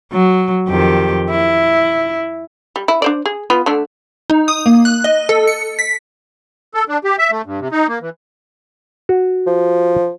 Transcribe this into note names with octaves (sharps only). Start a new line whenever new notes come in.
F#3
F2 D#3 G4
E4
G3
E4
D4 C5 D5
G#4
B3 F4 B4
D3 A3 D4
D#4
D#6
A#3
F#6
D#5
A4
C#7
B6
A4
D4
G4
E5
A3
G2
C3
D#4
A#3
E3
F#4
F3